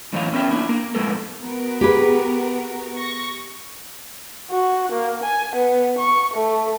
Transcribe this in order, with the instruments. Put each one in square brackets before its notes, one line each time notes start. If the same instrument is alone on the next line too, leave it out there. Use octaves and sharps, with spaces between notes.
[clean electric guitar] F#2 A2 E3 C#5 D#5 F5
B3 C#4 A#4 E5 G5
A#3 D4 E4
A#3 A#4
F2 A2 G#3 B3 A4 A#4
[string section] B3 F#4 A#4
[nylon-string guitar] G4 G#4 B4
[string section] C#6 A#6
[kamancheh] F#4
A#3
G#5
B3
C#6
A3